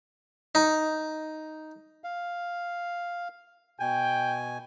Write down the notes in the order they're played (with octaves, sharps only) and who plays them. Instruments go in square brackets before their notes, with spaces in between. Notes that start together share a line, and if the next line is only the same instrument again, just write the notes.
[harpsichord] D#4
[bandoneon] F5
[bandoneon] B2 G#5 [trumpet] G5